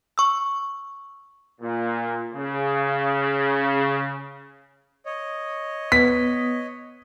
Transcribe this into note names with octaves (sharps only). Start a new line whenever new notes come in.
C#6 E6
A#2
C#3
C#5 D#5
B3 B6